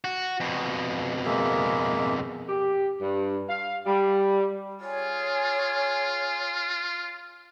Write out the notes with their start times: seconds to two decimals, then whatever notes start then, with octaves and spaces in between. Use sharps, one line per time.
0.04 F#4
0.40 F2 B2
1.25 G#3 A#3 E5
2.49 G4
3.01 G2
3.49 F5
3.86 G3
4.80 F4 G#4 C#5 G#5